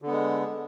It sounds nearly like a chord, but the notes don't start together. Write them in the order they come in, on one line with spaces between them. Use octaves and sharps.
D3 B3 G#3